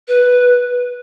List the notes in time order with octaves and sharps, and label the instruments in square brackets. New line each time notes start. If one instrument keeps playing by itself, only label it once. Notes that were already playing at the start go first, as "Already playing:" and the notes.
[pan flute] B4